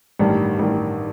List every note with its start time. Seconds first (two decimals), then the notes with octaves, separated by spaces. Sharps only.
0.19 A1 G2 D#3 G3
0.59 A1 G2 D#3 G3